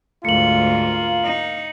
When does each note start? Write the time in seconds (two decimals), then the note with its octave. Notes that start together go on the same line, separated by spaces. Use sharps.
0.25 D2 G#2 A#3 F4 C#7 F#7
1.24 D#4